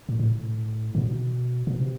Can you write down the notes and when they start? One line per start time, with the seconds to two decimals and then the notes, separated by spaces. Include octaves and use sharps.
0.09 A2
0.19 A2
0.95 C3
0.98 B2
1.67 B2
1.78 C3